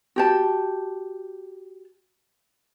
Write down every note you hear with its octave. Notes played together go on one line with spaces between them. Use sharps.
F#4 G4 A5